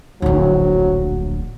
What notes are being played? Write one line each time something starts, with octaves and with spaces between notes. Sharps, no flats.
D1 A#1 F#3